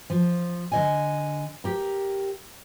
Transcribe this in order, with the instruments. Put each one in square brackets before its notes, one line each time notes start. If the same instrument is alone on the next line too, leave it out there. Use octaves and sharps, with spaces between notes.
[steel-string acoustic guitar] F3
D3 D#5 G#5
G4 A#4